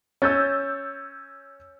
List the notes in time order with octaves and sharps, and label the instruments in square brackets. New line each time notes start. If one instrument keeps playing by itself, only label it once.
[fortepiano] C#4 [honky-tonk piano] E6 G6 A6